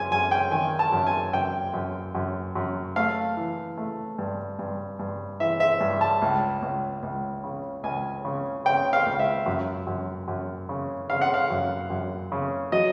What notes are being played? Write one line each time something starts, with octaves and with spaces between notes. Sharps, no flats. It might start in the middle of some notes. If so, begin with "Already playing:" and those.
Already playing: F#2 G#5
F#2 G#5
G5
D#3 G#5
A5
F#2
G#5
F#2 G5
F#2
F#2
F#2
A3 F5
E3
A3
G2
G2
G2
E3 E5
E5
G2
A5
C#2
C#2
C#2
C#3
C#2 G#5
C#3
C#3 G5
F5
C#2
E5
F#2
F#2
F#2
C#3
C#3 F5
F#5
F5
F#2
F#2
C#3
F#3 D#5